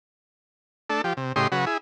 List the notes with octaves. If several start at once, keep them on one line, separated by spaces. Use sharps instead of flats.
A3 D4 A4
F3 G4
C3
A2 C#3 G4 D#5 C6
C#3 F#3 F#4 B4
E4 G#4